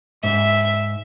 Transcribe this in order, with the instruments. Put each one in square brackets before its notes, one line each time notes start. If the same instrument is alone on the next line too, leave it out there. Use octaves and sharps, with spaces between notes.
[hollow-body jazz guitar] G#2 [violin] E5